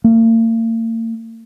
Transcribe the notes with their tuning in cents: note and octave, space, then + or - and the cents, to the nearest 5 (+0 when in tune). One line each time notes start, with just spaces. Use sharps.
A#3 -45